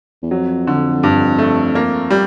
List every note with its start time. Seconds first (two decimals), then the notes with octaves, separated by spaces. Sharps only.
0.22 E2
0.31 F2 F#3
0.67 D3
1.03 G2
1.38 A3
1.75 A#3
2.10 G3